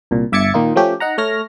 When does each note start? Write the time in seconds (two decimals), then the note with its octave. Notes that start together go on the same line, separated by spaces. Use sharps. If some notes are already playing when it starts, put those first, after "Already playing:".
0.11 C2 A#2
0.32 G1 E5 D6 G#6 A6 C#7
0.54 A#2 D#3 A#3 D#4 F4
0.76 F3 A3 C#4 G4
1.00 D#4 F#5 A#5
1.18 A3 C#5 F6 A#6